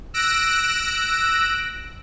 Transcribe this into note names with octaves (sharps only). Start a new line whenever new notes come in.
E6 F#6 A#6 D7